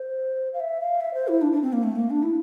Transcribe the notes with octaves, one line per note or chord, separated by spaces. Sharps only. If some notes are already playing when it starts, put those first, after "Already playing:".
Already playing: C5
F5
E5
F5
E5
C5
E4
D4
D4
C4
A#3
A3
A#3
D4
E4